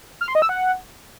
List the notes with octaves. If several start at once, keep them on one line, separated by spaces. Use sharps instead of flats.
F6
C6
D#5
E6
F#5